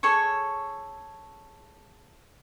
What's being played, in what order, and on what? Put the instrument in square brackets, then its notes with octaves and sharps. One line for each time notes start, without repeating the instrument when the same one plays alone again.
[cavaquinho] G#4 A4 C#5 C#6